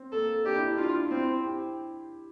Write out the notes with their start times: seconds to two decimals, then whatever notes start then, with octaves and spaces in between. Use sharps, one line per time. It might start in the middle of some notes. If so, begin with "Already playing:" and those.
Already playing: C4
0.12 A#3 A4
0.45 D4 G4
0.56 E4
0.66 D4
0.77 D4 F4
1.11 C4 E4
1.44 G4